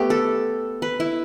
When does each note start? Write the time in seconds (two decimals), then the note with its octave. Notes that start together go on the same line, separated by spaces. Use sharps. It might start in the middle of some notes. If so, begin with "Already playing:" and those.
Already playing: A3 B3 G4
0.10 A4
0.82 B4
1.00 E4